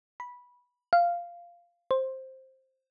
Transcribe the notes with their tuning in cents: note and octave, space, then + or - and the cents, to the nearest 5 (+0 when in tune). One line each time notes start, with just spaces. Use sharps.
B5 -15
F5 -10
C5 +10